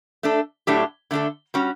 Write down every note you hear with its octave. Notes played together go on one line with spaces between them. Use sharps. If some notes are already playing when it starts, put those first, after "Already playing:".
A3 D4 A4
A2 F#3 A3 D4 G4
D3 A3 D4 A4
G3 C#4 F#4